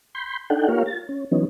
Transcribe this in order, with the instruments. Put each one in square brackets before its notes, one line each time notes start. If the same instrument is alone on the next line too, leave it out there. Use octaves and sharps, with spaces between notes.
[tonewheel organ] B5 C6 G6
D4 D#4 A4 F#5 G5
A#3 F4 G4 A#4 C#5 F5
A6
C#4
E3 F#3 B3 C#4 D#4